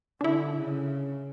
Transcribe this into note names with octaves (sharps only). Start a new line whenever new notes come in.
D3 D4 E4
C#3